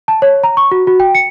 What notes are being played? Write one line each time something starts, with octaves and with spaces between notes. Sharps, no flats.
A5
C#5
A#5
C#6
F#4
F#4
G5
C#7